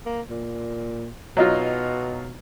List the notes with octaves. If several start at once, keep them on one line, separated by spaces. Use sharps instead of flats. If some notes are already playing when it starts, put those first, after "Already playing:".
A#3
A#2
B2 F#3 D#4 F4